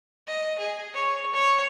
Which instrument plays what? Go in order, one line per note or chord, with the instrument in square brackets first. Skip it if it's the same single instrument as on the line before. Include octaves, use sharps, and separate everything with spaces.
[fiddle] D#5
G#4
C#5
C#5